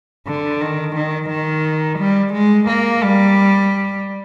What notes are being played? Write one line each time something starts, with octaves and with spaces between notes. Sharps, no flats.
D3
D#3
D#3
D#3
G3
G#3
A#3
G3